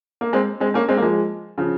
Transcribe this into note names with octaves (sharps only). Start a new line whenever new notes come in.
A#3
G#3 C4
G#3 C4
A#3 C#4
G#3 C4
A#3
F3 G#3
C#3 F3